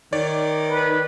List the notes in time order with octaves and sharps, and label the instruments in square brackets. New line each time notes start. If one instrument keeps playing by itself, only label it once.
[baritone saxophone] D#3 [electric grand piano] C#5 D5
[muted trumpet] B4